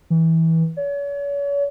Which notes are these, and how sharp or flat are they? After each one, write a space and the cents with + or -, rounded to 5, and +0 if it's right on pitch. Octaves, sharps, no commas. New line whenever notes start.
E3 -20
C#5 +40